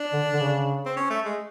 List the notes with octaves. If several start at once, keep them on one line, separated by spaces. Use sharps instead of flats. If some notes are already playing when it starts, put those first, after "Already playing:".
Already playing: D4
D3
D3
C#3
C4
C#4
A3
G#3